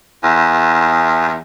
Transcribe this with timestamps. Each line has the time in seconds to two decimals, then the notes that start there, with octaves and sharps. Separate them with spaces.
0.24 E2